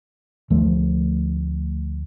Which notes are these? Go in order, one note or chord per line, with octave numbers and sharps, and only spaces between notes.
D2 F3 A3